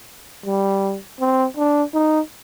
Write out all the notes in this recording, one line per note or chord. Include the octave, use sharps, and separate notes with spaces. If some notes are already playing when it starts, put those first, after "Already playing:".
G3
C4
D4
D#4